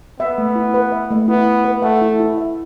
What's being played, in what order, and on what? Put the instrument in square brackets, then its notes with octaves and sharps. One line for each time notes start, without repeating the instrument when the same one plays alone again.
[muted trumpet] B3 [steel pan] E5
[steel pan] A3
E4
B4
E5
A3
[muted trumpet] B3 [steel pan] E4
[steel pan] E4
B4
[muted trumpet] A3 [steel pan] F#5
[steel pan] E4
E4
E5